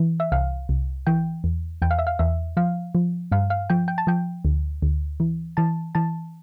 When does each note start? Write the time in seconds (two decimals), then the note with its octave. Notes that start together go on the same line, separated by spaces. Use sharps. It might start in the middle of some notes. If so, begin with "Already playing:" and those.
Already playing: E3
0.20 E5
0.32 C2 F5
0.69 C2
1.07 E3 G5
1.44 E2
1.82 E2 G5
1.91 F5
1.99 E5
2.07 F5
2.19 E2 E5
2.57 F3 F5
2.95 F3
3.32 G2 F5
3.50 F5
3.70 F3 G5
3.88 G5
3.98 A5
4.07 F3 G5
4.45 D2
4.82 D2
5.20 E3
5.57 E3 A5
5.95 E3 A5